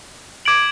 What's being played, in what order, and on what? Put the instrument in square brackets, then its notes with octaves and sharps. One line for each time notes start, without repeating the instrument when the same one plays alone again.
[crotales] D6 G#6 D7 F#7